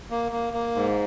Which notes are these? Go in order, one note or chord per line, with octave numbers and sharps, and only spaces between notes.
A#3
A#3
A#3
G#2